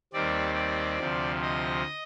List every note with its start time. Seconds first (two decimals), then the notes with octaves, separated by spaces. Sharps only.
0.13 D#2 D#3 G3 C4 D5
0.55 D5
0.99 D2 C3 F3
1.41 D#5